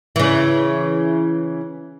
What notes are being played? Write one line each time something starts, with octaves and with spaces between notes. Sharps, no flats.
C#3 E3